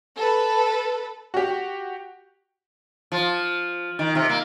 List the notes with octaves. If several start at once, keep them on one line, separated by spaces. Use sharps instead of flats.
A4 B4
F#4 G4
F3
D#3
C3
A#3